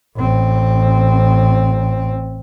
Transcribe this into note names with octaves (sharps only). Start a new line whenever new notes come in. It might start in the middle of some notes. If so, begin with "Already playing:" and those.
A1 C4